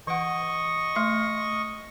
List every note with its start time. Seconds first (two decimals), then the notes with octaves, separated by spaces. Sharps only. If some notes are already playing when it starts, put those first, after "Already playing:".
0.07 E3 D#5 F#5 C#6
0.95 A3 E5 C6